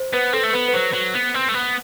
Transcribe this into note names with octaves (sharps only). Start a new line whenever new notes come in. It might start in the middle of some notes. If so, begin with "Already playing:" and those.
Already playing: C5
B3 B4
C4 A4
A3
B3 B4
B4
F#3 C5
F#3
B3
C4
A3
B3